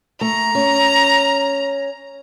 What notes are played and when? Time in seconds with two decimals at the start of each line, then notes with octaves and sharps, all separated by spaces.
0.21 A3 A#5
0.55 C#4